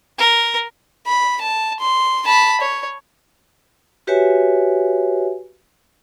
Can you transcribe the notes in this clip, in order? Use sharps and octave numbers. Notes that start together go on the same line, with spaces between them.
A#4
B5
A5
C6
A5 B5
C#5
F#4 G4 B4 C#5 E5 G#5